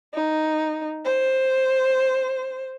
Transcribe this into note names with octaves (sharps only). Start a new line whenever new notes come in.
D#4
C5